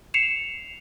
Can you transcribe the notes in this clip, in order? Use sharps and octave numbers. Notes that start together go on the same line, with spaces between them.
C7 C#7 E7 F7